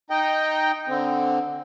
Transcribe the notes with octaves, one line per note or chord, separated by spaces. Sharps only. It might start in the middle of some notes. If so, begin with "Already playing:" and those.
D#4 D#5 G5
D3 C4